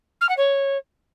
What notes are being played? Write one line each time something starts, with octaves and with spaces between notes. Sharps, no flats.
F6
F#5
C#5